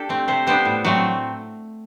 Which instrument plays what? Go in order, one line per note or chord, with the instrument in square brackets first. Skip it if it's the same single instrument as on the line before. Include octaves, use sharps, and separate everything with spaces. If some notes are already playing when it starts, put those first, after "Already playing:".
Already playing: [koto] D4 G4 A4
A3 C4
C3 C5
G3 B3 D4 C5
A2
F#3 A3 C4